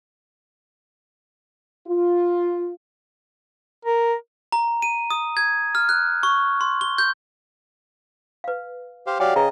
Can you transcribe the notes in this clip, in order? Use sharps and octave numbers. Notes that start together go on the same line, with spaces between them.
F4
A#4
A#5
D#7
D#6
G#6
F6
F#6
C#6
C6
G7
G6
B4 F5
G4 C5 F5
F#3 G4 D5 F5 G5 G#5
C#3 B4 D#5 A#5